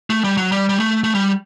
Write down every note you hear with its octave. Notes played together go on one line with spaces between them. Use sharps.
A3
G3
F#3
G3
G3
A3
A3
G3